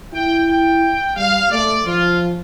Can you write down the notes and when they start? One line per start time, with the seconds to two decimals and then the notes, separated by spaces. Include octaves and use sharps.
0.13 E4 G5
0.48 G5
1.16 G3 F5
1.51 A3 D5
1.85 F3 F4